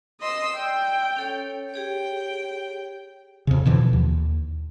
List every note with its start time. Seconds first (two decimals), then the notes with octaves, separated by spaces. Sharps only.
0.21 D#5 C6 E6
0.57 D5 G5 E6
1.16 C#4 A4 C#5
1.74 G4 G#4 C#5 G5
3.47 F2 C#3
3.66 B2 D3 E3 F3
3.93 D#2